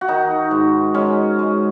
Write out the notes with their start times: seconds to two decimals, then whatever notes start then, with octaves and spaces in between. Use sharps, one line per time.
0.01 F#4
0.08 D#3 D#4
0.51 G#2
0.94 G#3 C#4
1.39 G#3